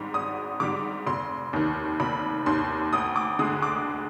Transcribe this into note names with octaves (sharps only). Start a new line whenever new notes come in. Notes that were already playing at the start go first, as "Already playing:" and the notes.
Already playing: G#1 G#2 G3
G#1 D#6
G#2 G3 D6
F1 C6
D#2 D#3
F1 B5
D#2 D#3 C6
D2 D#6
D6
D3 G#3 D#6
D6